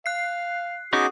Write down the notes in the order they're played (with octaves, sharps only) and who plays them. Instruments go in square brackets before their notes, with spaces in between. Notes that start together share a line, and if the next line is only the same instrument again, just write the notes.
[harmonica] F5 [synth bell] F#6 C7
[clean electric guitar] B3 C#4 D#4 [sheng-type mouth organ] F#4 G#4 D6